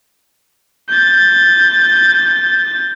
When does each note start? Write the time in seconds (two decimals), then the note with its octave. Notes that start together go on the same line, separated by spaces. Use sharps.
0.89 G6 A6